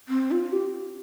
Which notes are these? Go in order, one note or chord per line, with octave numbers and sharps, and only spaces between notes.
C4
F4
G4